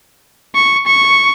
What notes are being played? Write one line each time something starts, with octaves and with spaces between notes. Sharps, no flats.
C#6
C#6